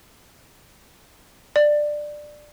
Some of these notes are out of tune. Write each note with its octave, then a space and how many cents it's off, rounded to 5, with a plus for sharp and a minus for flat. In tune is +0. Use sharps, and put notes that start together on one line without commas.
D5 +15